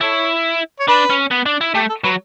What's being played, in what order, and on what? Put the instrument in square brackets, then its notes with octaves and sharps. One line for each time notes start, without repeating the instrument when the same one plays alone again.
[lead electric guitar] E4 [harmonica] A4 C#5
[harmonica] C#5
[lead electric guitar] D4 [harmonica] B4
[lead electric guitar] C#4
B3
D4
E4
[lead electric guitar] A3 [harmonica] G4
[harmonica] A4
[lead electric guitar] F#3 [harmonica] B4